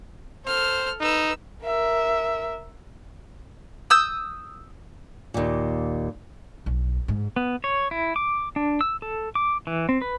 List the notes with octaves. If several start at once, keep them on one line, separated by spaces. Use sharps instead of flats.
A4 C5 F6
D#4 B4 E6
A#4 E5
D#6 E6 G6
D#2 A#2
B1
G#2
B3
C#5
E4
D6
D4
E6
A4
D6
E3
C4
B4